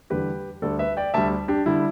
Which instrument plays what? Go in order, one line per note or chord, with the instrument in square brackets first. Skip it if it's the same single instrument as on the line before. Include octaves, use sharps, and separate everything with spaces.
[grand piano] E2 D3 G3 G4 B4
D2 D3 G3 A4 D5
B4 E5
D5 G5
D2 D3 G3 E5 A5
D4 G4
D3 G3 E4